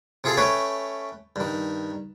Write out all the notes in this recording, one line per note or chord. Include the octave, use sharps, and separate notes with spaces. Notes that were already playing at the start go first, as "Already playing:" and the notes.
C3 F4 G#4 A4 F5
A3 C#4 B4 C#5 G5
G2 D#3